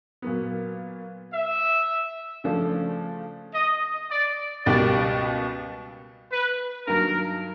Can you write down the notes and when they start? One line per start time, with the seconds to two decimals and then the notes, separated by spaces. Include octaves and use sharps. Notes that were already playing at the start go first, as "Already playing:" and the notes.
0.22 A#2 F#3 B3
1.34 E5
2.44 C#3 F3 A3 D4
3.55 D#5
4.11 D5
4.65 C#2 B2 G3 A#3 D5
6.31 B4
6.87 G2 D#3 F#3 A#3 A#4